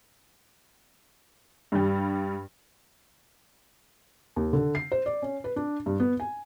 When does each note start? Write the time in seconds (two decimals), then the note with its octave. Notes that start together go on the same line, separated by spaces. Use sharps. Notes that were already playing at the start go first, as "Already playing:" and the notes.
1.72 G2 G3
4.36 D#2
4.53 D3
4.75 C7
4.92 C5
5.06 D5
5.22 C#4
5.44 B4
5.56 D4
5.86 G2
6.00 B3
6.20 G#5